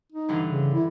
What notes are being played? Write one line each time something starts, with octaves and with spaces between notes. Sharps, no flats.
D#4
G2 D3 E3
C#3
E4